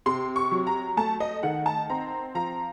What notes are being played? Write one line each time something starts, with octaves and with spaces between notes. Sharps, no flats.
C3 C6
C#6
F#3
A#5
A3 A5
D#5
D#3 F#5
A5
C4 A#5
F3 A#5